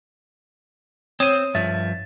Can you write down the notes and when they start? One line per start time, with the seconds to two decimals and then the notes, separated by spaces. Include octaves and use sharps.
1.20 C4 C#5 D#6 D#7
1.55 G2 F3 E5 A6